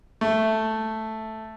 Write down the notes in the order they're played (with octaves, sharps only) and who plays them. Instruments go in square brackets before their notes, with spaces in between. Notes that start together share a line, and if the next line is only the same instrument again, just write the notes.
[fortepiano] A3